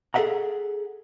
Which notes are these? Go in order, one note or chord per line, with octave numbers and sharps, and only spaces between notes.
G#4 A4 B4 E5 F#5 A#5